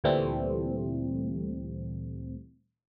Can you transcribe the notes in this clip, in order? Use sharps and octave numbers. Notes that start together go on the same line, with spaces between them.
D2 A#2 E3 G3 A3 C4